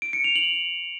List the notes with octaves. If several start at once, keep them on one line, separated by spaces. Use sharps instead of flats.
D7
C#7
F7
F#7